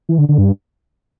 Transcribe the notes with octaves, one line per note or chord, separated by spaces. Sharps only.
E3
D3
D3
G2